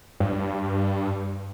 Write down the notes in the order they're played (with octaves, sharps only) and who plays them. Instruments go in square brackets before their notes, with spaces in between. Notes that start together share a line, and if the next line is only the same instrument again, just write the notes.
[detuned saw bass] G2